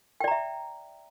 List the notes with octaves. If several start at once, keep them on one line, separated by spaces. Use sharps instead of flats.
D5 E5 G5 A#5